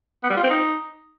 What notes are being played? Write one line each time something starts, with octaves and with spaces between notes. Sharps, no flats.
B3
G3
F4
C4
D#4